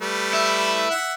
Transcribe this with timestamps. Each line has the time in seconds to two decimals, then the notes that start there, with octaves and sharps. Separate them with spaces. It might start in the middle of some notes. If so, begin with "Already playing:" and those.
0.01 G3 A3 B4
0.33 E4
0.90 E5 F#5